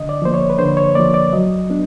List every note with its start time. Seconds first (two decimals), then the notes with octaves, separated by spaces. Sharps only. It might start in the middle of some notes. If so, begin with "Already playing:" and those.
Already playing: D3 D#5
0.09 D5
0.22 F3 A#3 C5
0.34 C#5
0.50 B4
0.59 D3 C5
0.77 C#5
0.95 F3 A#3 D5
1.14 D5
1.33 F#3 D#5
1.70 B3 D4